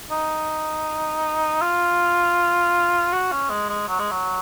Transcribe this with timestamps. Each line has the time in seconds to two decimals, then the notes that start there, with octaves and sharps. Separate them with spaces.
0.11 D#4
1.62 F4
3.13 F#4
3.32 C#4
3.50 G#3
3.69 G#3
3.88 F#3
3.99 G#3
4.11 F#3